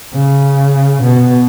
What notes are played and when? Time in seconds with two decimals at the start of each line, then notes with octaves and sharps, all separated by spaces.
0.15 C#3
1.03 B2